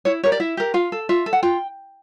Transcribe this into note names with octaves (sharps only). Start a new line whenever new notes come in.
E4 C#5
G4 A#4 C#5
D5
E4 E5
G4 A#4
F4 F5
A4
F4 E5
A4
F#5
F4 G5